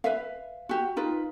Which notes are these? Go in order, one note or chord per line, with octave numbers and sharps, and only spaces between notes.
B4 E5 F5
F#4 G4
D#4 F4 B4